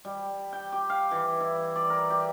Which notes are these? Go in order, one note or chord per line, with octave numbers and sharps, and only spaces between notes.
G3
G5
G4
F5
E3
E4
D5
A#4
G4